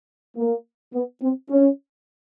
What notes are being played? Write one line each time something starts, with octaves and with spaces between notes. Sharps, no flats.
A#3
B3
C4
C#4